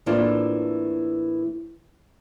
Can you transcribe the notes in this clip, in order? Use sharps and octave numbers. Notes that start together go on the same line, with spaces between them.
A2 E3 A#3 C4 D4 F4